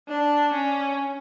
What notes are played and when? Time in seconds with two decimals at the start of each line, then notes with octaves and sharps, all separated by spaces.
0.08 D4
0.53 C#4